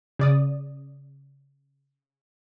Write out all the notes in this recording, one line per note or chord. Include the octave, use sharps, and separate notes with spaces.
C#3 D5 D#6